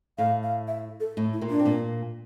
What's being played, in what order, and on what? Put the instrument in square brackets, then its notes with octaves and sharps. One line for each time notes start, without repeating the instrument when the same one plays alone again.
[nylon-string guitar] A2 A3 [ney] F5
[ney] F5
E5
A4
[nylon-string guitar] A2 A3
[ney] E4
[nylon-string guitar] A#2 A#3
[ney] D4
[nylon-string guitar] C4
A#2 A#3